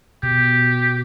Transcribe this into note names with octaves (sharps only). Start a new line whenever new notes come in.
B2 G4